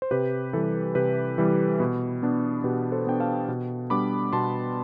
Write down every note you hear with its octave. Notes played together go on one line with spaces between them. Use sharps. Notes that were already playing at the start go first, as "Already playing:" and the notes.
C5
C3 G4 B4
E3 G3 A4
C3 G4 B4
E3 G3
B2
B3 D4
B2 G4 B4
A4 C5
B3 D4 G5
F5 A5
B2
G3 B3 D4 B5 D6
B2 A5 C6